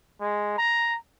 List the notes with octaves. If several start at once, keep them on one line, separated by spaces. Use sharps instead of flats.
G#3
A#5